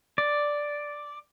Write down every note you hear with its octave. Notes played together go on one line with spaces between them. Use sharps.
D5